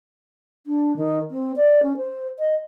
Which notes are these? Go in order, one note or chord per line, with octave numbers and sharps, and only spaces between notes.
D4
D#3
C4
D5
C#4
C5
D#5